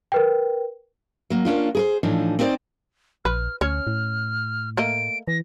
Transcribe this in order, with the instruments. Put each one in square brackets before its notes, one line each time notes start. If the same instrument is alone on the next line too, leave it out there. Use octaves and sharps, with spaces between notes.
[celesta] A#4 B4 G5
[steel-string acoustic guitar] F#3 A#3
A#3 C#4 D4 F4
G#4 A#4 C5
A2 E3 F3 D4 D#4
C4 D#4 E4 C5 D5
[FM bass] A#1 [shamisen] B4 [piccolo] F6
[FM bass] D2 [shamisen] C#4 C#5 [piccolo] F6
[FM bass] A2
[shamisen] A3 A#3 D#5 [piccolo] D7
[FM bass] E3 [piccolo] A#6